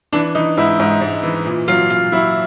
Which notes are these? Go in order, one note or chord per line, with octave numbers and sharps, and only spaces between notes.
E3 D4
E3 D#4
G#2 E4
G#2
G#2
E3
A#2
F#3 F4
A#2 F4
F#3 E4